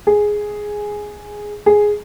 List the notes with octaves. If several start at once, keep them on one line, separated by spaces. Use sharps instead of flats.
G#4
G#4